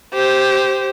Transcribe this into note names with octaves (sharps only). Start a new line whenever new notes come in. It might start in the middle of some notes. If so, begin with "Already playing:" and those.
G4 C5